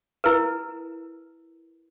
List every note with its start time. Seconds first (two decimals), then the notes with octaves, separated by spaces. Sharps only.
0.24 E4 A#4 B4